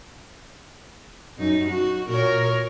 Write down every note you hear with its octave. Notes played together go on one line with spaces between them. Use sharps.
F#2 D#4
F#4
A#2 A#4 C#5